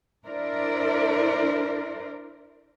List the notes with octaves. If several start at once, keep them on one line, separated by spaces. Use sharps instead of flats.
D4 E4 A#4 C5 D5